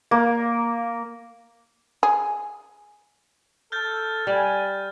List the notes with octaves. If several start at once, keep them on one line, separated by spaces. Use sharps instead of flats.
A#3
G#4
A4 F6 G6 A6
G3 D5 G#5